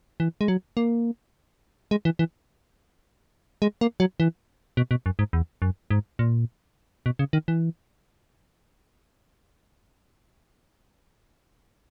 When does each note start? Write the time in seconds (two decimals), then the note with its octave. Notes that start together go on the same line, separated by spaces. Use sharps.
0.20 E3
0.41 G#3
0.48 F#3
0.77 A#3
1.91 G#3
2.05 E3
2.19 E3
3.62 G#3
3.81 A#3
4.00 F#3
4.20 E3
4.77 B2
4.91 B2
5.06 F#2
5.19 G#2
5.33 E2
5.62 F#2
5.90 G#2
6.19 A#2
7.06 B2
7.19 C#3
7.33 D#3
7.48 E3